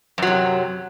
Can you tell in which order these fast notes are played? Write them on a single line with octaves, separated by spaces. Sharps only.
F#2 F#3 C3